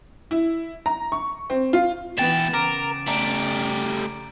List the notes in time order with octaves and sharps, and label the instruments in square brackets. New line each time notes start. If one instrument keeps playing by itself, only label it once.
[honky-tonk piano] E4
A#5
C#6
C4
F4
[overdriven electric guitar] B2 G5 [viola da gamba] E3 B3 [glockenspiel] A6 E7
[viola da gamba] C#3 [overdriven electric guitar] A#4 [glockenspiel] D6 D7
[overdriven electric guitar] G3 A3 [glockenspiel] A#5 D7